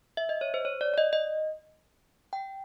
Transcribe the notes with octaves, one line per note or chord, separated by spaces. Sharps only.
E5
D#5
C#5
C5
C#5
D5
D5
D#5
D#5
G5